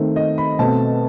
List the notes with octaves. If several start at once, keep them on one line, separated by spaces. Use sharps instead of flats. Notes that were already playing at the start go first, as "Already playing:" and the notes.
Already playing: D#3 A3 C4
D#5
B5
B2 A3 C4 A5